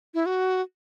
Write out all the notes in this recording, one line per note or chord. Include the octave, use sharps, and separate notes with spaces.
E4
F#4